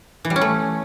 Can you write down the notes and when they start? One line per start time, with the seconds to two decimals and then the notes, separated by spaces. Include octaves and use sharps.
0.25 E3
0.30 G3
0.36 C#4
0.41 A3